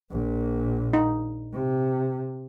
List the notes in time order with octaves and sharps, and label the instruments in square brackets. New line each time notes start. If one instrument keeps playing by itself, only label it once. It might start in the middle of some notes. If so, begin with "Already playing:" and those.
[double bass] A#1 A#2
[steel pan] D#4
[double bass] C3